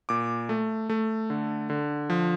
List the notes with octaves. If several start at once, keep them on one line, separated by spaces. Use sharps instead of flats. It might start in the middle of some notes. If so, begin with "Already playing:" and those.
A#2 D6
A3
A3
D3
D3
F3